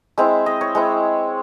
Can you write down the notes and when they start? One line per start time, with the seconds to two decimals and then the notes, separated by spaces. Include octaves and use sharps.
0.18 G#3 C4 E4 E5
0.46 D#5
0.61 C#5
0.75 G#3 C4 E4